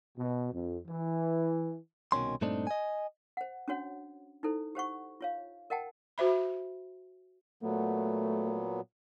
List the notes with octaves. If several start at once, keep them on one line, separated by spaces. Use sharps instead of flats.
B2
F2
E3
C2 B2 D#3 C#4 C6
G2 A#2 A3 C4 D4 D#4
D#5 G#5
C5 F#5
C#4 D4 F#4 C#5 F#5
D#4 E4 A4 C5
G4 C5 F#5 C#6
F4 C#5 F5
A#4 D#5 F#5 G5 A5
F#4 C5 E5 B5
A#2 F#3 A3 B3